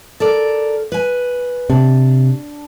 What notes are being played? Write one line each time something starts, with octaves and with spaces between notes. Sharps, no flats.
A4 A#4 D5
B4 G#5
C3 D4